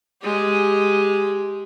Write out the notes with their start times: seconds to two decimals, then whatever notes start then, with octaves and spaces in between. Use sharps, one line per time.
0.22 G#3 G4